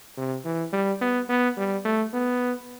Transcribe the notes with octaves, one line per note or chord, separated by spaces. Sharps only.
C3
E3
G3
B3
B3
G3
A3
B3